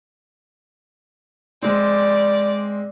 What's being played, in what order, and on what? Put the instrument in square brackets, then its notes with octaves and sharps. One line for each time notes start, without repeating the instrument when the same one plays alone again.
[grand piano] G#3 C4 [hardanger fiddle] D5